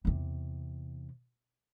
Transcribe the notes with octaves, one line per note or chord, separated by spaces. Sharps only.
E2 C3